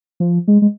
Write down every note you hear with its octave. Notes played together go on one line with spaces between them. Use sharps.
F3
G#3
G#3